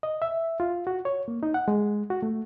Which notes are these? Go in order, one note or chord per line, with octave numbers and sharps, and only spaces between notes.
D#5
E5
F4
F#4
C#5
A#3
D#4
F#5
G#3
F#4
A3